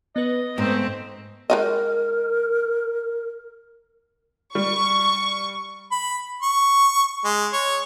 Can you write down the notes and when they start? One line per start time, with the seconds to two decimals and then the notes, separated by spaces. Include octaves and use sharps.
0.16 B3 B4 D#5
0.58 G#2 A3 C4
1.50 G#3 D#4 A#4 D#5
4.55 G3 C#6
5.92 B5
6.42 C#6
7.24 G#3
7.53 C#5